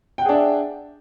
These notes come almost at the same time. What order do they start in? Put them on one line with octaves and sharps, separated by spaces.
G5 F#5 G#4 D4 E5